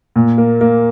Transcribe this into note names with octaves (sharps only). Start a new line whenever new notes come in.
A#2
A#3
A#3